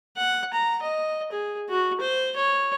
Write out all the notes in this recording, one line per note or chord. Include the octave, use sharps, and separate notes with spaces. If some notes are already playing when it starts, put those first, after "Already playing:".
F#5
A#5
D#5
G#4
F#4
C5
C#5